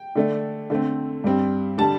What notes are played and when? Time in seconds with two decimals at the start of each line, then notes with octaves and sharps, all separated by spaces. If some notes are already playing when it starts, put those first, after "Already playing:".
Already playing: G5
0.16 D3 A3 D4
0.70 D3 A3 C4
1.24 G2 G3 C4
1.78 D3 G3 A5